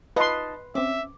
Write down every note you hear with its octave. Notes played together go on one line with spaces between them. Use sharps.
D#4 F4 B4 A5 C6 D#6
C4 C#4 E5 D6